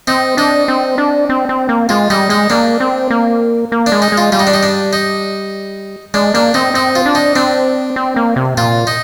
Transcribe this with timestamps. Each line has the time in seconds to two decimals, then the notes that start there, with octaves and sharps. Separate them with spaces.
0.07 C4 D#4
0.37 D4 D#4
0.68 C4
0.98 D4
1.29 C4
1.49 C4
1.69 A#3
1.89 G#3 F4
2.10 G3 D#4
2.29 G#3 D#4
2.50 A#3 D4
2.80 C4
3.10 A#3
3.72 A#3
3.86 D4
3.92 G#3
4.02 D#4
4.12 G#3
4.18 F4
4.32 G3 F4
4.39 D#4
4.47 D4
4.54 D#4
4.63 D4
4.93 D#4
6.14 G#3 D4
6.34 A#3 D4
6.54 C4 D#4
6.74 C4 D#4
6.95 F4
7.06 D4
7.15 D#4
7.36 C4 D4
7.96 C4
8.16 A#3
8.36 C3
8.57 A#2 F4
8.87 D#4